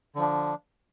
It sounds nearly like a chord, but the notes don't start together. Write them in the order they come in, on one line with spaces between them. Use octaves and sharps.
D3 F3 D4